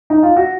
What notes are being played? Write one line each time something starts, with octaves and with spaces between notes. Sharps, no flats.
D#4
F4
F#4